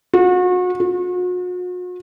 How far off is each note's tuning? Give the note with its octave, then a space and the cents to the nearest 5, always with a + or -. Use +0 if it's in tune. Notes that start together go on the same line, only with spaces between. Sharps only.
F#4 -35
F#4 -45